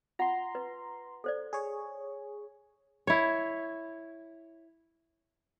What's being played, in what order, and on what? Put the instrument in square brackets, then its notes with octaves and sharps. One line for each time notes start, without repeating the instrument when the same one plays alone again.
[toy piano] F4 F#5 [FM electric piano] A#5 C6
[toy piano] B4
A4 C5 D5
[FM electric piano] G#4 C#5
[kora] E4 C#5